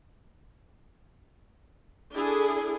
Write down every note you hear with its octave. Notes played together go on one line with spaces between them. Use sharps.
D4 E4 G#4 A4